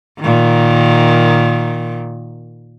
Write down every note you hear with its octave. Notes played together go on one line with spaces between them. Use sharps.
A#2 D#3